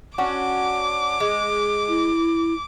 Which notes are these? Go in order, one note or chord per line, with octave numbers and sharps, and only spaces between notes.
C#4 D4 F#4 D6
G#3
E4